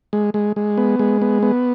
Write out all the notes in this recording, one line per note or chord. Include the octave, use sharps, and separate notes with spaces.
G#3
G#3
G#3
B3
G#3
B3
B3